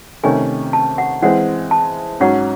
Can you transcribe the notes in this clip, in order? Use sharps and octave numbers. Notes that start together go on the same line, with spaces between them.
C3 D#3 A3 C#4 G#5
A5
F#5
E3 G#3 C4 F#5
A5
G#2 F#3 C#4 F#5